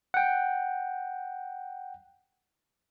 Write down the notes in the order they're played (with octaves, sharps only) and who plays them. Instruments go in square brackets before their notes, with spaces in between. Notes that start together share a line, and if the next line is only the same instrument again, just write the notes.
[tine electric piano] F#5 G5